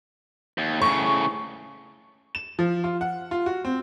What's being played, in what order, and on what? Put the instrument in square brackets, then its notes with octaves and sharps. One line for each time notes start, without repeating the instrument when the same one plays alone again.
[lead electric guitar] D#2
[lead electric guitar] A2 C#3 [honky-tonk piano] C#6
[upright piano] E7
F3
F4
F#5
F4
F#4
C4